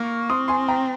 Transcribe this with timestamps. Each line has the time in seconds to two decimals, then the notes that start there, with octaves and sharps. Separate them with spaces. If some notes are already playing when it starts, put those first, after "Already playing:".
Already playing: A#3 C#6 F6
0.29 C4 C6 D#6
0.48 G#5 C6
0.68 G5 A#5